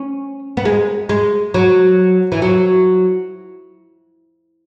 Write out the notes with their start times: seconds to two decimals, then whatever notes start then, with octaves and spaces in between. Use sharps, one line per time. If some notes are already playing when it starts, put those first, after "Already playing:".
Already playing: C#4
0.57 B3
0.65 G#3
1.09 G#3
1.54 F#3
2.32 E3
2.42 F#3